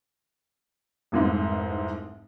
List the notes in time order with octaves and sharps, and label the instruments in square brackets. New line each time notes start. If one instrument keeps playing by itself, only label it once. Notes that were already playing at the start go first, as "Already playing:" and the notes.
[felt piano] F1 C2 G#2